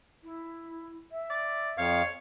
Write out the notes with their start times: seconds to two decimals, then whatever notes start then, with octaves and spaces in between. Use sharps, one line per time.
0.23 E4
1.12 E5
1.30 D5
1.78 F2 C#5 F5